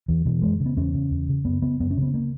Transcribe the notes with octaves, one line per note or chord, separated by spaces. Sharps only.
E2 E3
B2 E3
F#2 G#3
C#3
B3
E2 C#4
C#3
E2
C#3
F#2 B3
C#3 B3
F#2 B3
C#4
C#3 B3
A#3